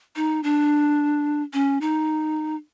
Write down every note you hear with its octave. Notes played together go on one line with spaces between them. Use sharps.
D#4
D4
C#4
D#4